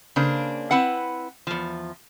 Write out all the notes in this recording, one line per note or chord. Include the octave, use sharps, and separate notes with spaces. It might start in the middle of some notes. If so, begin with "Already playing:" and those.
C#3 A#3 D4 C5
C4 E4 B4 F#5
E2 F3